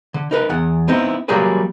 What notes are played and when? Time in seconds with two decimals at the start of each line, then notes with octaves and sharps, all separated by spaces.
0.14 D3
0.31 D#4 A#4 B4
0.49 E2 F#5
0.88 B3 C4 D#4 E4
1.28 F#3 G3 A#3 G4 G#4 B4